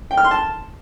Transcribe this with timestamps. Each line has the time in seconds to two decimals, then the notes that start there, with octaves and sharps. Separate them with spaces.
0.11 G5
0.18 F6
0.24 C6
0.31 A5